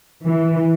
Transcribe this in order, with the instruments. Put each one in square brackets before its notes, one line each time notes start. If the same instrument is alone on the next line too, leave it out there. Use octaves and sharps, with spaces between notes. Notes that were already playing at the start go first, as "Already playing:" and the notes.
[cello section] E3